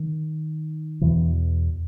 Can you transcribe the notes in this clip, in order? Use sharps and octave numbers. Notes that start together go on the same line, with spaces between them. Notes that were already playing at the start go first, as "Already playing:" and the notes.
Already playing: D#3
E2 B2 E3